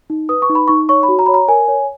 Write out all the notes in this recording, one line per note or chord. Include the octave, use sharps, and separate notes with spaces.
D#4
B4 D#6
C#6
D#4
B5
D#4 C#6
C#5 C#6
B5
F#4
A#5
C#5 B5
A#5
A#4 G#5
C#5